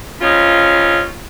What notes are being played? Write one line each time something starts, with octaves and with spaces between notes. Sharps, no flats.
C#3 C4 D#4 F4 C#5